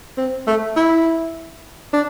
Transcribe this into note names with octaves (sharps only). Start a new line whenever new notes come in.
C4
A3
E4
D4